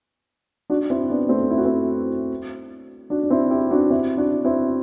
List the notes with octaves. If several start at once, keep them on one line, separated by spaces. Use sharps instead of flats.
D4 F#4
C4 E4
B3 D4
A3 C4
E4
F#4
C4 E4
D4 F#4
D4
C4 E4
E4 G4
D4 F#4
C4 E4
D4 F#4
C4 E4